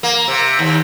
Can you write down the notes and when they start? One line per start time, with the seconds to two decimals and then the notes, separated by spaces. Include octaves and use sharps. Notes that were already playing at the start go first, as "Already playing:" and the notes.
0.03 A#3
0.28 C3
0.59 D#2